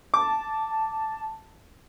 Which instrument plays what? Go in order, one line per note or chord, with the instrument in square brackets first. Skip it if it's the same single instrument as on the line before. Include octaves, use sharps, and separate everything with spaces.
[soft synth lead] A5 [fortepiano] D6